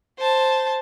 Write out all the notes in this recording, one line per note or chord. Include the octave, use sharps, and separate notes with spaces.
C5 A5